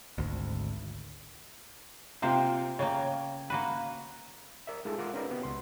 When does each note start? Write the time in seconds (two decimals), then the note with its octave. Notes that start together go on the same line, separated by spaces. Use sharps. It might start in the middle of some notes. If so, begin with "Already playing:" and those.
0.18 G#1 D2
2.22 C3 A#3 F4 C5 G5
2.79 C#3 A#3 C#5 G5
3.50 A#3 F#4 B4
4.67 A#4 D5 E5
4.85 G#3 D#4 F4 G#4 A4
4.98 F4 A#4 E5 F#5 D6
5.14 C#4 D#4 A#4 B4 D5
5.30 B3 F#4 G4
5.43 C#2 C6